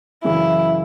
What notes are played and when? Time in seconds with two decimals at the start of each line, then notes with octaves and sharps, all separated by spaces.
0.24 F#2 C#3 E3 E4